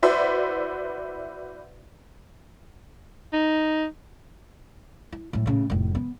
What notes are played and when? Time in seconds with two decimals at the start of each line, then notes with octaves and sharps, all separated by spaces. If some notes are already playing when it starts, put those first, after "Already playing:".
0.03 E4 F#4 B4 C5 D5 E5
3.33 D#4
5.12 E4
5.33 A2 F#3
5.46 A2 C#3
5.70 F1 A2
5.95 B3